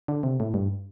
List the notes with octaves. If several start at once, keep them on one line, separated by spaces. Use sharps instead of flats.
D3
C3
A2
G2